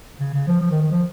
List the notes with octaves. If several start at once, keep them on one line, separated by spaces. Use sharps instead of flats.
C#3
C#3
F3
F3
D#3
D#3
F3